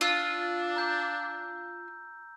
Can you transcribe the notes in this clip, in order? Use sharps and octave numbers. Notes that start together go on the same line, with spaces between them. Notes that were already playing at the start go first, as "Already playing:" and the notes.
D4 F4 E6
A#5 G6